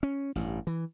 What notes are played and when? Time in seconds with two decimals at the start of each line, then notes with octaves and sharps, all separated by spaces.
0.03 C#4
0.35 A1 G2
0.67 E3